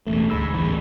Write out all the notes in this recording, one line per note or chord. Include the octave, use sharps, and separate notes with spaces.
E1 A1 A3
D2 G#2 B5 E6
A1 E2 G#2